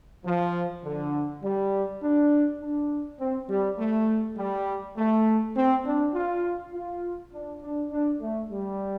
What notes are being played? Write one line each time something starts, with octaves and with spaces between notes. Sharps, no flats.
F3
D3
G3
D4
D4
C4
G3
A3
G3
A3
C4
D4
F4
F4
D4
D4
D4
A3
G3